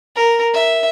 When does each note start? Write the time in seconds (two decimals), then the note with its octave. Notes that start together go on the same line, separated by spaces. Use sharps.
0.16 A#4
0.54 E5